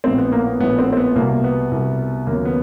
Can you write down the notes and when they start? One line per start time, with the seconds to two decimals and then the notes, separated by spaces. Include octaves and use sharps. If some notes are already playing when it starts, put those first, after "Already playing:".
0.04 A#1 A2 F3 C4
0.18 B3
0.32 A#3
0.46 B3
0.60 A#1 A2 F3 B3
0.79 C4
0.93 C4
0.97 B3
1.15 C2 B2 G3 A#3
1.44 B3
1.71 C2 B2 G3
2.27 D#2 C#3 F#3 A#3
2.45 B3